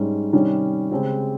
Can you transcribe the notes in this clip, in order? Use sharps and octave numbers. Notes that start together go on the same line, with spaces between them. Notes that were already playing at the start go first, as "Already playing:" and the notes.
Already playing: G#2 G3 C#4 G#4
C3 D#3 G3 C#4
C#3 G#3 C4 G4